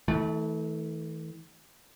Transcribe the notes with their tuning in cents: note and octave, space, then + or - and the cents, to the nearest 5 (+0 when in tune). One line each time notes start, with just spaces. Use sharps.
E3 -40 A3 -5